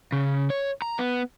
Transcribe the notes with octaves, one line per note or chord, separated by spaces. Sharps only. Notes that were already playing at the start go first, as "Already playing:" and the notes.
C#3
C#5
A#5
B3